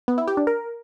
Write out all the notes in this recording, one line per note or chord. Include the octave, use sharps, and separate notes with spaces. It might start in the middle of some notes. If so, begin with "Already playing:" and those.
B3
E4
G4
D4
A#4